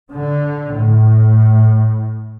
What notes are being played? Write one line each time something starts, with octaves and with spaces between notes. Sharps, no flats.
D3
A2